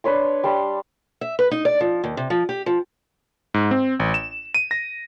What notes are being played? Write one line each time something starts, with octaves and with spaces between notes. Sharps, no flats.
D4 B4 C#5 C6
G3 A5 C6
E5
B4
D#4
D5
F3
D#2
C3
F3
G4
F3
G#2
C4
A1
E7
D#7
A#6